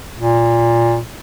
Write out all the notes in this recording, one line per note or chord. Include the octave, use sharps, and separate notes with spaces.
A#2